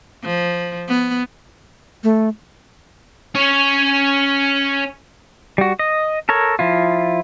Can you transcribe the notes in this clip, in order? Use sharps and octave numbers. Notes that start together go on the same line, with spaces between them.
F3
B3
A3
C#4 C#5
G3 F#4
D#5
A4 A#4 C#5
F3 E4 F4